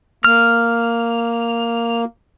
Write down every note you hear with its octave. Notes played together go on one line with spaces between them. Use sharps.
A#3 F6